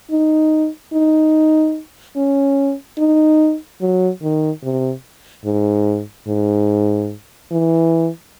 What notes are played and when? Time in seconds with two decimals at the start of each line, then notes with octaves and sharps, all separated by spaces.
0.11 D#4
0.93 D#4
2.16 C#4
2.98 D#4
3.81 F#3
4.22 D#3
4.63 C3
5.45 G#2
6.27 G#2
7.51 E3